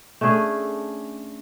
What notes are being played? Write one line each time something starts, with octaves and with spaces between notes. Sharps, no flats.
A3 C#4 D4 G#4